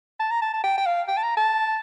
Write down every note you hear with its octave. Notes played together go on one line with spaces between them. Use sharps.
A5
A#5
A5
A5
G5
G5
F5
G5
A5
A#5
A5